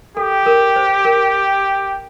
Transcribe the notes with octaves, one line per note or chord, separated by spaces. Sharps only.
G4 A4
A#4
C5
A#4